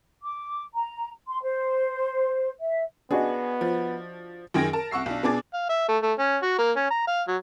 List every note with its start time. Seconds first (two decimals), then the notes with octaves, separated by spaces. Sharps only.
0.23 D6
0.75 A#5
1.28 C6
1.42 C5
2.60 E5
3.11 B3 D4 F#4 G#4 D#5
3.61 F3
4.54 F#2 D#3 G#4 G5 A#6 D7
4.73 A#4 A5
4.91 C2 F#5 C#6 E6 C7
5.06 B1 D4
5.23 B2 B3 D4 G#4 D6 A6
5.53 F5
5.69 E5
5.88 A3
6.03 A3
6.19 C#4
6.43 F#4
6.58 A#3
6.76 C#4
6.90 A#5
7.07 F5
7.28 F#3